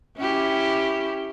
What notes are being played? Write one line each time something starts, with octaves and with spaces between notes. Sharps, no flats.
C#4 E4 G4